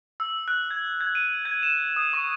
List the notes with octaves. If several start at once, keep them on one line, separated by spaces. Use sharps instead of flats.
E6
F#6
G#6
G#6
D#7
G#6
E7
D#6
C#6